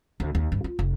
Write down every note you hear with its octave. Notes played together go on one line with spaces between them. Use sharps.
D2
D#2
G2
F4
F1